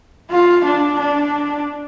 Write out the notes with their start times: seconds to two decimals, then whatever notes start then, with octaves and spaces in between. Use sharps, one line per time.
0.30 F4
0.65 D4
0.99 D4